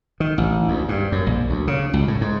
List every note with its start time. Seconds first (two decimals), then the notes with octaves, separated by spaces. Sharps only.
0.20 D#3
0.38 A1
0.68 D2
0.89 G2
1.12 F#2
1.26 A#1
1.50 D2
1.67 C#3
1.93 C#2
2.08 A2
2.21 G#2